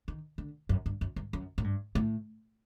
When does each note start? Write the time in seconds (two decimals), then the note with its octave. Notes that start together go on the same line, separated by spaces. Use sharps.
0.08 D#3
0.38 D3
0.69 F#2
0.86 G2
1.01 F#2
1.16 G2
1.33 F#2
1.58 A2
1.64 G2
1.95 A2